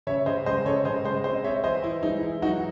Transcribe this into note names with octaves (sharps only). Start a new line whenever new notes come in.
C#3 C#5 E5
C#3 C5 D#5
G#3 C5 D#5
C#3 A4 C#5
C#3 C5 D#5
G#3 C5 D#5
C4 C5 D#5
C4 C#5 E5
E3 C5 D#5
E3 E4
G#3 D#4
E3 E4
F#3 D#4 F#4